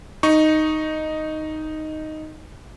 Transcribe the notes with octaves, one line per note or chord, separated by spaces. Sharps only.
D#4 C#6